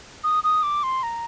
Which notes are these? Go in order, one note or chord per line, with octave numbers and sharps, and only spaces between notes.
D#6
D#6
D6
C6
A#5